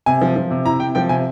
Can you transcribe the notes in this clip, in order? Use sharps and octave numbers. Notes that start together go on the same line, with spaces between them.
C3 G#5
F3
F3
C3
E4 A#5
C3 G5
F3 G5
C3 G#5